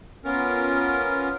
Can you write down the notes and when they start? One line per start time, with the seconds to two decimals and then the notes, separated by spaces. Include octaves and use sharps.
0.25 B3 C#4 F4 A#4